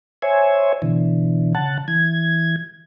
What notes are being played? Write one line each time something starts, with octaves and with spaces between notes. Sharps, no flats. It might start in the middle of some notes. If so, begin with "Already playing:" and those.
C5 C#5 E5 G#5
B2 D3 E3
C#3 F#5 A5
E3 G#6